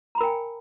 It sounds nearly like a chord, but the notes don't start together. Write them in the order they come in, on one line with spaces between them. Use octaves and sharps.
A#5 B5 A#4 G5 G#5